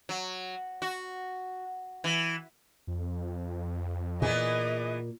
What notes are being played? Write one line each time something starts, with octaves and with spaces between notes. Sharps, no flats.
F#3
F#4
E3
F2
A#2 E3 B3 G#4 D#5